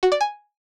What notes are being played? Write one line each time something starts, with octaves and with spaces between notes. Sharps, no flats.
F#4
D5
G#5